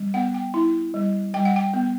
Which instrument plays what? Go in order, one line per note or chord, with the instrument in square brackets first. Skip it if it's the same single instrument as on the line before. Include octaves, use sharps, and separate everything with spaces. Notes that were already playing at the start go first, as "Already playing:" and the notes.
Already playing: [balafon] G3
B3 F#5
G5
E4
G3
G3 G5
F#5
G5
B3